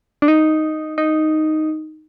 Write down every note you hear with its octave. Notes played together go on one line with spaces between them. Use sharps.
D4
D#4
D#4